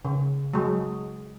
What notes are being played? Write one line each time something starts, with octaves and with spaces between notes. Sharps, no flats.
C#3
F#3 G#3